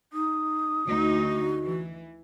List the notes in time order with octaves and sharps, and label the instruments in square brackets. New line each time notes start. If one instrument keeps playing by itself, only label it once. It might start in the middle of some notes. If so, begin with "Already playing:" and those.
[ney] D#4 [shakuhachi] D#6
[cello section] D2 D#4 [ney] F#4
[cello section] E3